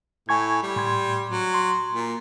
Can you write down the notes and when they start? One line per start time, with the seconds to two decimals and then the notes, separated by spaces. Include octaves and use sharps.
0.29 A2 G#5 C#6 G#6
0.63 G3
0.76 A2 C6 G#6
1.30 F#3
1.54 C6
1.92 A#2